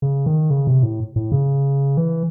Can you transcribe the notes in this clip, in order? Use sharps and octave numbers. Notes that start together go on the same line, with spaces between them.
C#3
D#3
C#3
C3
A2
A2
C#3
E3